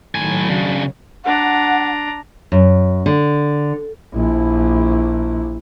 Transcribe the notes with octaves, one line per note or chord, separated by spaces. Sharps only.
A2 D#3 F#3 G#5
C#3 D4
D4 F#5 A#5
F#2
D3
A#1 E4